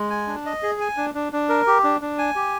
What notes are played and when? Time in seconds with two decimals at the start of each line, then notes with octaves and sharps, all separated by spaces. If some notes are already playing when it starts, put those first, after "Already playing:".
Already playing: G#3
0.10 G#5
0.28 D4
0.46 D#5
0.63 G#4
0.81 G#5
0.97 D4
1.15 D4
1.33 D4
1.49 A#4
1.67 G4
1.84 D4
2.02 D4
2.18 G#5
2.36 G4